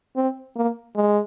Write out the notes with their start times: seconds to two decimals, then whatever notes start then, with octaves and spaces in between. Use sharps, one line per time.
0.16 C4
0.56 A#3
0.96 G#3